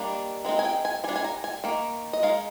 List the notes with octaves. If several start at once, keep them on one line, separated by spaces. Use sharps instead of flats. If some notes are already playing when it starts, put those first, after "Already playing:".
Already playing: D#3 G3 A#3 D4
G#3 C4 D#4
G#5
G5
G#5
G3 D4 G#5
G#5
A#5
G#5
D#3 A#3
D#5
G#3 D#4 F5